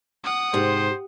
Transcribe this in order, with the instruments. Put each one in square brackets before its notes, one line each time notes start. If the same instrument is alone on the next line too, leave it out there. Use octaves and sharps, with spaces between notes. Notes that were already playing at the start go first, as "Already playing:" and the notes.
[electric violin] F#5 D#6
[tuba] G#2 [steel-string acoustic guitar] C3 [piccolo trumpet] C5